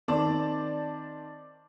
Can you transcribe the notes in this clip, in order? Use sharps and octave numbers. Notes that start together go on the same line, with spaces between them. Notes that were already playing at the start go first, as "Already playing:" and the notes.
D#3 C4 D5 A5